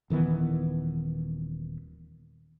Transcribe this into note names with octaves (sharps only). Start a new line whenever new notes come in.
D#1 D#3 E3 B3